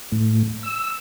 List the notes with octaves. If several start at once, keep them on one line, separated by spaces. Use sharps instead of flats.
A2
E6